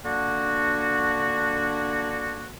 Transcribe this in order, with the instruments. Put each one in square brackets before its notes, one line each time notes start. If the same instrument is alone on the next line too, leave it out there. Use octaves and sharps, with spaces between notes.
[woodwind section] D3 A#3 D4 F#4